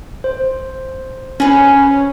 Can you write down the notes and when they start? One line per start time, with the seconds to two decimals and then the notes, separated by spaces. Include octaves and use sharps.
0.24 C5
1.40 C#4 G#4 B4